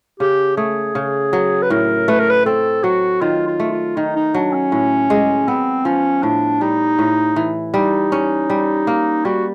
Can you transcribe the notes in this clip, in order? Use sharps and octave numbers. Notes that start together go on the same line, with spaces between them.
C#3 G4
A3 G#4
C#3
F#3
B4
A2 A#4
A3 B4
A#4
B4
C4 A4
F#3 F#4
D#3 F4
F4
A3
F4
D#3 D#4
D#4
F#3 D4
C#4
A2
G#3
B3 C4
F3 C#4
A2 D4
G3 D#4
A2
E3
G3 D#4
C#4
G3
A#3
G3 F#4